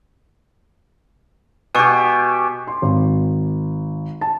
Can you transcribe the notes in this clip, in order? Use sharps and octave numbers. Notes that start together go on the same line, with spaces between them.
B2 G4 G#5 C#6
C6
G#1
A5